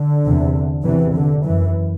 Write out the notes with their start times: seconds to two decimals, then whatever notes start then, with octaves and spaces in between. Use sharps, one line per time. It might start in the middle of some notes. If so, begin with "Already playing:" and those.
Already playing: D3
0.24 E2 C3
0.84 E2 C3 E3
1.14 D3
1.45 F#2 E3